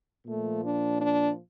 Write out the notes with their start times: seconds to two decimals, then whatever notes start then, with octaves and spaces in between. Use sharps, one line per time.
0.26 A#2 A3
0.32 F3
0.62 D4
0.97 D4